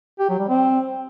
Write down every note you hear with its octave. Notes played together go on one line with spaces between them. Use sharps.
G4
F#3
G3
C4